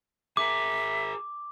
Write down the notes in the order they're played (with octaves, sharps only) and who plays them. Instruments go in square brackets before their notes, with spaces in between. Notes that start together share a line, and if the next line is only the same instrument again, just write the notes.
[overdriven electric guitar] G#4 A#4 [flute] E5 [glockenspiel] D6